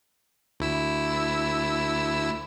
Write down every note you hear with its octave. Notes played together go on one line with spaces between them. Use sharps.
D2 E4 E6